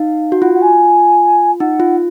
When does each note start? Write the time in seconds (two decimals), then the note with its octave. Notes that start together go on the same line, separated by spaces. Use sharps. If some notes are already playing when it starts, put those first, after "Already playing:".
Already playing: D#4 F5
0.32 F#4
0.41 F4 F#5
0.54 F#5
0.61 G#5
1.59 D#4 F#5
1.80 F4